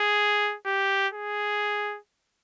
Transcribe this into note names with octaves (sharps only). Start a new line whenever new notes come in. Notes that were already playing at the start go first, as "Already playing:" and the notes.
Already playing: G#4
G4
G#4